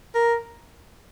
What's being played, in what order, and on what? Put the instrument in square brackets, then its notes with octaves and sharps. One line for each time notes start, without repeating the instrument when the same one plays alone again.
[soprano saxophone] A#4